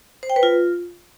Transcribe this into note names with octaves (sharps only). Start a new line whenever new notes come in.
C5
G5
B4
F4